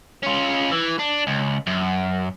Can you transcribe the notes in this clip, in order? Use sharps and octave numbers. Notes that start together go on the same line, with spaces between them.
C#4 F4
E3
D4
C#2
F#2